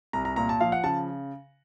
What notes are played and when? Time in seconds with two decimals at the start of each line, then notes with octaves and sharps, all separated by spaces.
0.13 C2 A#5
0.25 A#5
0.36 A#2 A#5
0.49 A5
0.61 F3 F5
0.72 F#5
0.84 C#3 A5